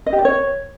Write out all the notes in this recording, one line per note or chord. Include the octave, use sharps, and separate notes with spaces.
D#5
G4
D5
C#5